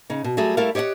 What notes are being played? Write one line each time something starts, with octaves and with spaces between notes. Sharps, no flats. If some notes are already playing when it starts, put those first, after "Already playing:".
C#3 D#4
B2
F#3 G3 A3 G#4
G3 A3 E4 A#4 F5
G4 C#5 D#5 E5 F#5